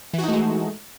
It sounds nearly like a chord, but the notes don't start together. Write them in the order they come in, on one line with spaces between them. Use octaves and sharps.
E3 F#4 D#4 A3 G#3